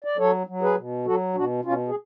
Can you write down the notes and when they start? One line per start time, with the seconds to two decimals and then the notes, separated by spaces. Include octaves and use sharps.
0.04 D5
0.17 F#3 A4 C#5
0.47 F#3
0.62 G#4 B4
0.77 B2
1.06 F#3 F#4 A4
1.35 B2 D4 F#4
1.65 B2 C#4 F4
1.88 G#4